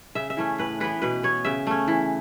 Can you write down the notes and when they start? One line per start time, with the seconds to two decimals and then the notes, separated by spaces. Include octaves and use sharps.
0.15 C#3 E5
0.30 E5
0.37 E3 A3 C#4
0.58 A2 B4
0.80 E3 B3 B4
1.02 B2 B4
1.23 B3 C#5
1.45 C#3 E5
1.67 A3 C#4
1.88 E3